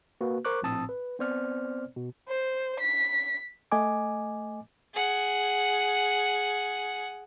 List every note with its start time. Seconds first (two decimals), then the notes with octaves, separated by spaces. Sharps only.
0.21 A#3 F#4 B4
0.45 A#4 C5 C#6 D6 F#6
0.62 A#1 A2 C4 A5 D#6 E6
0.89 B4
1.19 B3 C4 C5 D5 F6
1.96 B2
2.28 C5
2.80 B6
3.72 A3 D#5 G#5 D6
4.94 G#4 F#5